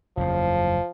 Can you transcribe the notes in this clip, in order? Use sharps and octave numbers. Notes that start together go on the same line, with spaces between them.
F#1 E2 C#3 F3